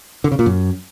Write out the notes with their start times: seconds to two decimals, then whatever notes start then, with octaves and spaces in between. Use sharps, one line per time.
0.24 D3
0.32 C#3
0.39 A#2
0.46 F#2